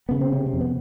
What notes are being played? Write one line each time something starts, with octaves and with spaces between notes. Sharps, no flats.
C#3 B3
C4
C3 C#4
C4
F2
B3